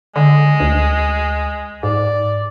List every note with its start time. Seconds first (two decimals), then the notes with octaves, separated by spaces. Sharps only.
0.16 D3 G#3
0.60 D2
1.83 G#2 D5